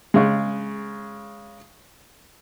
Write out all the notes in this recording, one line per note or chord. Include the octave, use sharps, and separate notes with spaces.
C#3 G#3